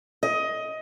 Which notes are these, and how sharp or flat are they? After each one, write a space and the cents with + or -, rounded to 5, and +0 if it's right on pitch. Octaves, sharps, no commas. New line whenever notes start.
D#5 +15